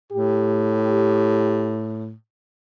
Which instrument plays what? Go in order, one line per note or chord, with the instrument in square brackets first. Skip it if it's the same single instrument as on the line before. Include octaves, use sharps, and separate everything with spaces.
[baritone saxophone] A2 [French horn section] G4